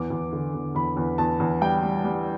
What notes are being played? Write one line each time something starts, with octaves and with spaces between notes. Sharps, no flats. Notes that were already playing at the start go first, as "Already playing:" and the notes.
Already playing: E2 D6
E2
D3
E2
E2 B5
E2
E2 A5
E2
G3 G5
G3
G3